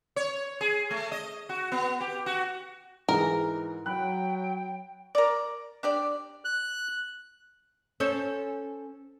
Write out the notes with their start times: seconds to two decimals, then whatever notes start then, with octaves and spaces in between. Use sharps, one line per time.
0.16 C#5
0.61 G#4
0.91 A3
1.12 D#5
1.49 F#4
1.72 B3
2.01 G4
2.26 F#4
3.09 G#2 E3 G#4 A#4
3.86 F#3 G5 B5 F#6
5.15 A#4 D5
5.83 D4 G4 D5
6.45 F#6
8.00 C#4 A4 C5 C#5